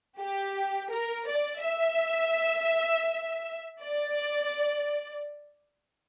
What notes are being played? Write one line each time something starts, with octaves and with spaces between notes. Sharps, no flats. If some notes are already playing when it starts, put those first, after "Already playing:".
G4
A#4
D5
E5
D5